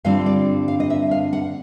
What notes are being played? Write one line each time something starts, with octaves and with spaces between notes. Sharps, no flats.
G2 D3 G3 C4 F4 F5
D5
F5
D#5
E5
F5
F#5